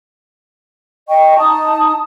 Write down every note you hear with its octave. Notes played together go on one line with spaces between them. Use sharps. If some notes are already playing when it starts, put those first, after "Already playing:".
D#5 G5 C#6
D#4 A5 D#6